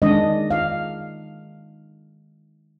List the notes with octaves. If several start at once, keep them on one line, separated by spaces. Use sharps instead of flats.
D#3 G#3 D4 D#5
F5